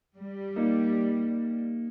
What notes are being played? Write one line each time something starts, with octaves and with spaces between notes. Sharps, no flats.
G3
A#3 D#4